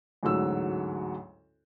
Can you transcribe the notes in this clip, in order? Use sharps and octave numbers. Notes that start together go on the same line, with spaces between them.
A1 D2 G#2 F#3 E6